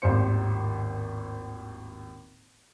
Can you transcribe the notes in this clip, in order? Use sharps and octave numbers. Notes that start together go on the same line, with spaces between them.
D#1 G#1 A2 G3 C5 C#7